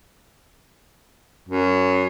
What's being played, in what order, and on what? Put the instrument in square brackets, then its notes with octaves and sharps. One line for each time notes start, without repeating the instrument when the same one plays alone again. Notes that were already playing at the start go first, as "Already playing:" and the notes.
[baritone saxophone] F#2